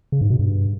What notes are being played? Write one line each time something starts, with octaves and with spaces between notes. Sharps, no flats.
C#3
G#2
B2
G2